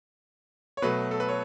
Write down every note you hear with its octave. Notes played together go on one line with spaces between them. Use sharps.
C#5
B2 F#3 A3 B4
A4
B4
C#5